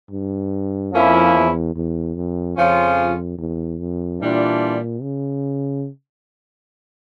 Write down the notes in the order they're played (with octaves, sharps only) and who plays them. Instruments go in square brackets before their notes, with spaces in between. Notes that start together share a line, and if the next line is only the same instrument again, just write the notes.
[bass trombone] G2
[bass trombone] F2 [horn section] F3 A#3 C#4 E4
[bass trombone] E2
E2
F2
[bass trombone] F2 [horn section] C#3 F3 C#4 F4
[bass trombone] E2
F2
[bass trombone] A#2 [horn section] E3 G3 D4 F4
[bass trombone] C#3